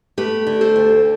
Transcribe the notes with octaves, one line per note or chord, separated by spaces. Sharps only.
A3 G4 B4
D3
A4 C5
D2